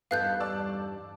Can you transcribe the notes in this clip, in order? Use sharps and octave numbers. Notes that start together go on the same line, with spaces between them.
E2 G2 B3 D#4 A4 F5 F#6 G6
D5 A5 E6